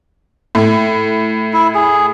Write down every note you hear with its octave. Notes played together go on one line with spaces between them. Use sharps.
A2
E4
G#4